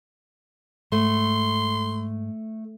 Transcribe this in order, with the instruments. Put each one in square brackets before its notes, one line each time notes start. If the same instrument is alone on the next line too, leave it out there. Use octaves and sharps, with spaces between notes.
[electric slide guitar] G#2 [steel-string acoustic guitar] A3 [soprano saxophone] C6